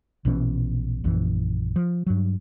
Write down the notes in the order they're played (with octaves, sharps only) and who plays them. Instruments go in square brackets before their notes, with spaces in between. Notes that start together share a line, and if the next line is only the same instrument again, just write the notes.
[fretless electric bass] A#1 B2 E3 C#4
A#1 F#2 E3
F3
G2 F#3